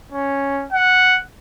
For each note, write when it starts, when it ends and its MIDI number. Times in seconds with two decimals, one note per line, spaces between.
0.12 0.65 61
0.72 1.19 78